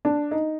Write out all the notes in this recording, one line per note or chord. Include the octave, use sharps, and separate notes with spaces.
D4
D#4